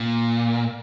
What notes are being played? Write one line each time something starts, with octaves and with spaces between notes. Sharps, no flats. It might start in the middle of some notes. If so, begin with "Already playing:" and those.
Already playing: A#2